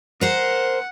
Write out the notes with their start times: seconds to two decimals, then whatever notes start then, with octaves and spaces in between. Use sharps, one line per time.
0.21 A#4 C5 F#5